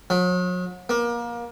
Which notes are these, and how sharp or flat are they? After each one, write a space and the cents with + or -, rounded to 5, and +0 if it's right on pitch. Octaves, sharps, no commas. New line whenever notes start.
F#3 -40
A#3 +25